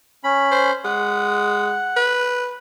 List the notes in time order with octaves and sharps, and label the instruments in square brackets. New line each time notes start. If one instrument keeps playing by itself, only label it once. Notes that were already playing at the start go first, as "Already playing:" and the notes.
[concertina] C#4 B5
[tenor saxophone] C5
[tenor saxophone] G#3 [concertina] F#5
[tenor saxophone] B4